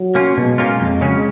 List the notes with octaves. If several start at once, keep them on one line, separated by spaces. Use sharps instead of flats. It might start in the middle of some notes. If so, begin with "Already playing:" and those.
Already playing: F#3
A#3 C#4 F4
B2 G#3
A#3 C#4 F4
F2
C#3 F#3 C#4